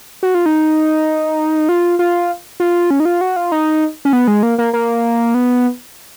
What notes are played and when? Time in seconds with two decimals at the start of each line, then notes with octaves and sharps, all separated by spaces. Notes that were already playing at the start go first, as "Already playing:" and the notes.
0.23 F#4
0.35 F4
0.46 D#4
1.69 F4
1.99 F4
2.60 F4
2.90 C#4
3.00 D#4
3.05 F4
3.21 F#4
3.36 F4
3.52 D#4
4.05 C#4
4.13 B3
4.28 G#3
4.43 A#3
4.58 A#3
4.73 A#3
5.34 B3